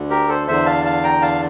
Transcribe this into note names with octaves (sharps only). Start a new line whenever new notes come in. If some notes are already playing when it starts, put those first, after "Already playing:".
Already playing: D2 D3
G4 A#4
A4 C5
E2 D3 C5 E5
F5 A5
F5 A5
G5 A#5
F5 A5